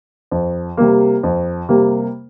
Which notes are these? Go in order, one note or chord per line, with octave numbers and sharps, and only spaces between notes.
F2
C3 G3 A#3
F2
C3 G3 A#3